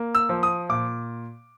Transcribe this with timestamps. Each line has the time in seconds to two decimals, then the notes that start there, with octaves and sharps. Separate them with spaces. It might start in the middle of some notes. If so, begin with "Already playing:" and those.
Already playing: A#3
0.15 E6
0.29 F3
0.43 D#6
0.69 A#2 D6